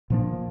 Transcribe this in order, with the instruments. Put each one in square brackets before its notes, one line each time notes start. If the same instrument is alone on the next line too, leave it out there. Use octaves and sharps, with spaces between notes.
[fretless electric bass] A#2 F3 A#3 D4